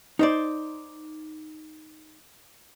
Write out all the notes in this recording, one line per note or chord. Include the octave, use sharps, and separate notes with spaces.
D#4 C5 D5